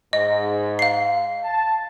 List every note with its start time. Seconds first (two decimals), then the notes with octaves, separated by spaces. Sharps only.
0.13 G#2 D#5
0.79 F5 C7
1.44 A5